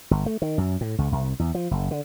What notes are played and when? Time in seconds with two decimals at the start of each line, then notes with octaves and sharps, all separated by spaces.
0.11 G1
0.26 A3
0.42 D#3
0.58 F#2
0.81 A2
0.98 C#2
1.12 C2
1.39 E2
1.55 F3
1.71 F#1
1.91 D3